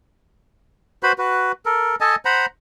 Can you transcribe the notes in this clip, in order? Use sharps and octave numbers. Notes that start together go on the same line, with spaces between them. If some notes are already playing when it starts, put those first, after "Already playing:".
F#4 B4 C5 B5
F#4 B4
A4 A#4
A4 D#5 G#5 A5
C5 F#5 A#5 B5